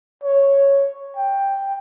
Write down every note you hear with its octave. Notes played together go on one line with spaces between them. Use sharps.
C#5
G5